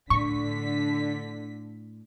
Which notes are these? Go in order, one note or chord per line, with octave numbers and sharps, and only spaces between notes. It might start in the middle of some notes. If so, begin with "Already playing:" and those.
A2 D3 C#6 B6